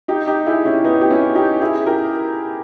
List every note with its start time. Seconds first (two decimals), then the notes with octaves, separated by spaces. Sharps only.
0.08 D#4 G4
0.27 D#4 G4
0.46 E4 G#4
0.65 C#4 E4
0.84 B3 D#4
1.01 G4
1.10 C#4 E4
1.35 D#4 G4
1.61 E4 G#4
1.87 G4 A#4